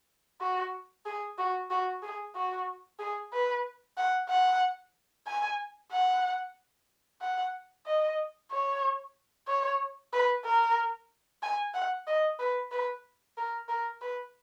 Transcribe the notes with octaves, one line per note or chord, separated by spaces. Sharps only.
F#4
G#4
F#4
F#4
G#4
F#4
G#4
B4
F#5
F#5
G#5
F#5
F#5
D#5
C#5
C#5
B4
A#4
G#5
F#5
D#5
B4
B4
A#4
A#4
B4